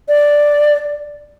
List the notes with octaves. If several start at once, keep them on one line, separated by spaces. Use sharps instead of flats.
D5